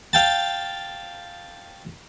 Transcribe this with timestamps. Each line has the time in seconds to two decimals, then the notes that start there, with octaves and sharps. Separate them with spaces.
0.13 F5 G5 A5